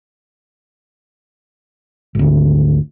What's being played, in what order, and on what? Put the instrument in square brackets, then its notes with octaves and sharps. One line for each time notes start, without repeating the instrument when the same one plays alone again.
[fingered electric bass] G#1 D2